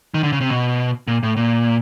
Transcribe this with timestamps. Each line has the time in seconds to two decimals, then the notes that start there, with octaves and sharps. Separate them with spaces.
0.14 D#3
0.23 D3
0.32 C#3
0.41 C3
0.50 B2
1.08 A#2
1.23 A2
1.37 A#2